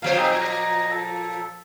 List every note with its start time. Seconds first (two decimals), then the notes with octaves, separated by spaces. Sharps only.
0.02 A#2 F3 C5 F5
0.16 C4 D#4 G#4
0.40 D#5
0.91 A4